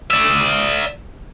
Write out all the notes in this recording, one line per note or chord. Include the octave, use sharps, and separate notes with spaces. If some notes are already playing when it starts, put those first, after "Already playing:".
D5 E5